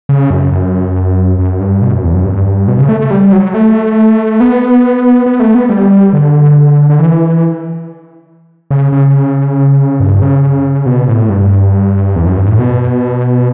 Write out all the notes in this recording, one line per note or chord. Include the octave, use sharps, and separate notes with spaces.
C#3
F#2
F#2
F#2
G2
B2
F#2
E2
F#2
G2
B2
C#3
A3
A3
G3
F#3
A3
B3
B3
A3
B3
G3
D3
D3
E3
C#3
C#3
G2
C#3
B2
A2
G2
E2
F#2
G2
A2
B2